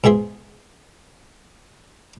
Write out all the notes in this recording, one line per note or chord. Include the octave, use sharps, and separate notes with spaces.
G#2 B2 G#4 E5 C6